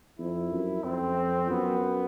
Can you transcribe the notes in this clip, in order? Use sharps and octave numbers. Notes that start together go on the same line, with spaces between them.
F2 E4
F#2
F2 C4
F#2 B3